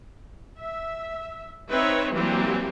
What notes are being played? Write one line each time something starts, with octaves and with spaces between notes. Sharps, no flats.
E5
C4 D#4 B4 C#5 E5
E3 F#3 G3 A#3 C4 G4